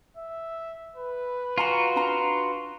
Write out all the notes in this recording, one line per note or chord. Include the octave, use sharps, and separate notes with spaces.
E5
B4
F4 F#4 G#5 A#5 B5
D4 A#5